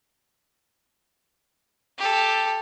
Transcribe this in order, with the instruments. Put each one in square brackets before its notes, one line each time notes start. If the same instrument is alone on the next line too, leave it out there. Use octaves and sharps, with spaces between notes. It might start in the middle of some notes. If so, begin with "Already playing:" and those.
[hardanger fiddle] G4 A4